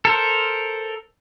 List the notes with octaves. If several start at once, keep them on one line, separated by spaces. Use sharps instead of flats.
A4 A#4 C5